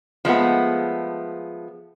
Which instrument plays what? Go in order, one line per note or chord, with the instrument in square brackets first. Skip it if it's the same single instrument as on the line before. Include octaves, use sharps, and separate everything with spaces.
[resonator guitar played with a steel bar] F3 G#3 A3 B3